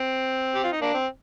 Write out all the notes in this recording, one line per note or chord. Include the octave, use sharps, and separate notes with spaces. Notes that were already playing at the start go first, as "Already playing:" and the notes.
Already playing: C4
G4
F4
D#4
A#3 D4
C4